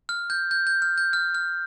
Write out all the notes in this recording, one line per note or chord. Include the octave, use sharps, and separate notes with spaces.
F6
G6
G6
G6
F6
G6
F6
F6